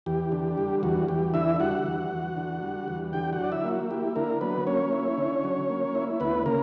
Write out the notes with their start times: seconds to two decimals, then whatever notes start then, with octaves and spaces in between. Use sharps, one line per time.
0.06 E2 G4
0.32 D3
0.58 G3
0.83 E2 F#4
1.08 E2 G4
1.34 D3 E4 E5
1.60 G3 F#4 F#5
1.86 E2
2.11 E2
2.36 D3
2.62 G3
2.88 E2
3.13 D3 G4 G5
3.33 F#4 F#5
3.39 F#3 D5
3.52 E4 E5
3.65 A#3
3.71 F#4
3.90 E4 G4
4.16 D3 A#3 A#4
4.41 F#3 B3 B4
4.67 A#3 C#4 C#5
4.92 E4
5.18 D3
5.44 F#3
5.70 A#3
5.95 E4
6.20 D2 B3 B4
6.46 C#3 A#3 A#4